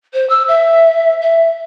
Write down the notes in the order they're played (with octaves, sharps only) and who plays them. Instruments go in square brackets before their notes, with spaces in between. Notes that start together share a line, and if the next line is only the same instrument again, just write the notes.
[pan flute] C5
E6
E5
E5